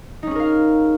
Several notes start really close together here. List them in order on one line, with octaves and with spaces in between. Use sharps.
D#4 C#4 G#4 A#4 F5